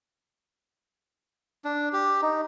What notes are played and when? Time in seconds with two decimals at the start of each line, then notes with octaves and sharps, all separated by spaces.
1.64 D4
1.93 G4
2.22 D#4